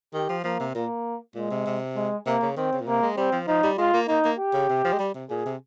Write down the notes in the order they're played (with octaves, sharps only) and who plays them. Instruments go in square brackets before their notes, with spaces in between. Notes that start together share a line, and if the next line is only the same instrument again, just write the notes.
[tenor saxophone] D#3 [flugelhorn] G4
[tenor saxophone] F3
[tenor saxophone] F3 [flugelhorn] A#3
[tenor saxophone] C3
[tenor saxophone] A#2 [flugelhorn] A#3
[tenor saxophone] A#2 [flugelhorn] G#3
[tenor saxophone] C3
C3
[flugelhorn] G#3
[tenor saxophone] C3 [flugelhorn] A#3
[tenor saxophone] C#3
[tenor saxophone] D#3 [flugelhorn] C4
[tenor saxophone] C#3
A#2
[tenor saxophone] C3 [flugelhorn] A#3
[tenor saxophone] G#3
[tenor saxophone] G3 [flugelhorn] C4
[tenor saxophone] F3
[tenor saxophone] F3 [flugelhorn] D#4
[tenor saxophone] G3
[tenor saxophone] G#3 [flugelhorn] F4
[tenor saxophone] A#3
[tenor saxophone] A#3 [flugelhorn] D#4
[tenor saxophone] A#3
[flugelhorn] G4
[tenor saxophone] C#3
C3
F3
G#3
G3
C3
[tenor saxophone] A#2 [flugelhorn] G#4
[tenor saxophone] C3